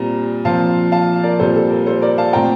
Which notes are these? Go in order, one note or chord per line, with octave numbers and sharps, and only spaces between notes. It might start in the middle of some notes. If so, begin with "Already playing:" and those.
Already playing: A#2 G3 C4 A#5
A#2 F3 C4 F5 A5
F5 A5
A#4 D5
A#2 G3 C4 A4 C5
A4
A#4
A4 C5
A#4 D5
F5 A5
A#2 A3 C4 G5 A#5